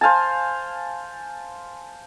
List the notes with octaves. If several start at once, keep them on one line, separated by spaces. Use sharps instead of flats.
C5 F5 G#5 A5